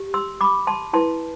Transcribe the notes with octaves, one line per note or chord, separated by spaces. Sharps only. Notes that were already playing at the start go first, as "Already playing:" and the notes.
Already playing: G4
C6 E6
B5 D6
A5 C6
E4 B4 A5 C6